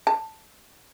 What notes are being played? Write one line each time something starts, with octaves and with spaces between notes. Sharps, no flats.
A5